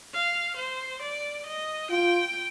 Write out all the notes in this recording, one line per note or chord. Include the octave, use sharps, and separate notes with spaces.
F5
C5
D5
D#5
F4 G5